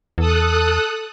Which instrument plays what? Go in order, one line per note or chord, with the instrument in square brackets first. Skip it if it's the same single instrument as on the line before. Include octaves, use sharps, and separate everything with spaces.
[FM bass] E2 [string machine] A4 D#6 F#6